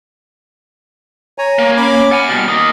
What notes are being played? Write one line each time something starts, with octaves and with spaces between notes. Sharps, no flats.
C#5 G#5 A#5
A#3
C#4 B5 D6
F#5 G#5 F6
B2 G3
A#3 D#5